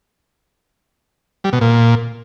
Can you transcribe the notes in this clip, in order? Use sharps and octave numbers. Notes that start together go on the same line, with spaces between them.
G3
B2
A#2